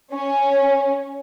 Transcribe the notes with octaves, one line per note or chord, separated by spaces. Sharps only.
C#4